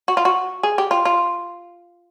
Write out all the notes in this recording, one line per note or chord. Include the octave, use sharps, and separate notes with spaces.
F#4
F4
F#4
G#4
G4
F4
F4